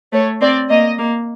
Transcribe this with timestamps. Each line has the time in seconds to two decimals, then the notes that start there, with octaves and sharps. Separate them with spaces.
0.13 A3 C#5
0.41 C4 D5
0.70 A#3 D#5
0.98 A#3